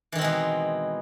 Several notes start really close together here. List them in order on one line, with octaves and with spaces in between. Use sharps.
E3 D#3 C4 G#3 B2